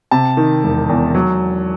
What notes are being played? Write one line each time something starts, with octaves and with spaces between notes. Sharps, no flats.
C3 A5
D#3
E1
E2
F#3